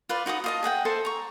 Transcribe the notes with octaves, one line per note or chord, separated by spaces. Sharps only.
F4 B4 D5
D#4 F#4 G#5 D#6
F4 D#5 A5
G#4 D#5 F#5 G5
A4 C5 E5 G#5
A#5 C#6